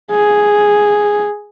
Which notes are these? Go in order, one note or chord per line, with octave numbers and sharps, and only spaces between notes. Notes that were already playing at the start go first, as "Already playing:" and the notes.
G#4